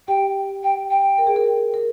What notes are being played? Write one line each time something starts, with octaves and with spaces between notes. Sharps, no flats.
G4 G5
G5
G5
A#4
G#4
A#4
A#4